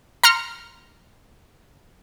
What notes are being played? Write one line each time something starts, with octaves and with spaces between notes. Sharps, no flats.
A#5 C6 F6 C#7